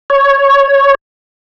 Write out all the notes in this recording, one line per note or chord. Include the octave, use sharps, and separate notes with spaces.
C#5